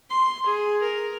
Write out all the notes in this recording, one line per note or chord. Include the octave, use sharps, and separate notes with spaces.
C6
G#4
A#4